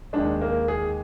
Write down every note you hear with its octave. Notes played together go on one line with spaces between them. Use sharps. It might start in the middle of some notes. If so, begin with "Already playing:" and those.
D#2 D#3 G#3 D4
A#3
G#4